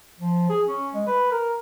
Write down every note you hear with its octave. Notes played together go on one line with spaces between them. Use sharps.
F3
G#4
C#4
G#3
B4
A#4